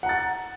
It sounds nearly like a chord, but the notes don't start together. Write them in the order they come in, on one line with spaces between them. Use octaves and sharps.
F#5 A#5 A6